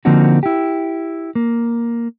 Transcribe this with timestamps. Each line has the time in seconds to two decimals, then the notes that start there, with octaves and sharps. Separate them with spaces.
0.05 D3 F3 A#3 C4 D#4 F#4
0.43 E4 G4
1.35 A#3